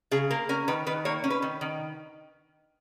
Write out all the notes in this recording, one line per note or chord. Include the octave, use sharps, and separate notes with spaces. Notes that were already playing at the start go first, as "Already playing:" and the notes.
C#3 G#4
A#3 A#4
C#4 A#4
D#3 B4
D#3 B4
A#3 C#5
C#4
B4
D#3
D#3